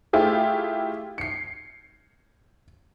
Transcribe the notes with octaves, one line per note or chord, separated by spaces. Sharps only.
A3 E4 F4 G4 G#4
C7 C#7